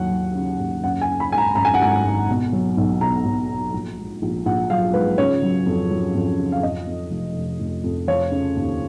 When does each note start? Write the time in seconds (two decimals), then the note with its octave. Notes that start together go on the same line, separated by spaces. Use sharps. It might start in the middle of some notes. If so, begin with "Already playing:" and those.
Already playing: D#2 F#3 F#5
0.11 F#3
0.35 C#3
0.59 D#2
0.84 F#2 F#5
1.01 G#5
1.08 C#3
1.20 B5
1.32 G#1 G#5
1.38 A#5
1.55 F#2 A#5
1.65 G#5
1.74 F#5
1.81 G#1 G#5
2.04 G#1
2.29 B2
2.53 F#3
2.77 B1
3.01 B2 A#5
3.25 B1
3.49 B2
3.74 A#1
3.97 G#2
4.22 A#1
4.45 A#1 F#5
4.70 F#3 F5
4.94 G#2 B4
5.18 C#3 C#5
5.42 F#3
5.66 F2
5.91 F#3
6.15 F2
6.38 C#3
6.52 F5
6.63 F2 D#5
6.87 F2
7.11 F1
7.35 F1
7.60 F1
7.84 F2
8.08 F3 C#5
8.31 C#3
8.56 D#2